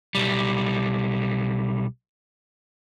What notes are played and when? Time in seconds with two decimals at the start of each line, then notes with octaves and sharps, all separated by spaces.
0.15 B1 G3